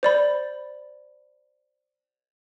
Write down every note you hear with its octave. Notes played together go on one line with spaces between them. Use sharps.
C5 D5 B5